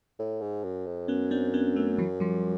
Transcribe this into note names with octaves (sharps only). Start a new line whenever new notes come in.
A2
G#2
F#2
F2
F#2 B3 C#4
C4 D4
B3 C#4
A3 B3
E3 F#3
F3 G3